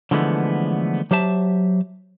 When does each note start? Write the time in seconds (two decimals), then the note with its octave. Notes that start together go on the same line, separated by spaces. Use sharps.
0.11 D3 E3 F3 G#3 A3 B3
1.11 F#3 G4 C5 E5 A5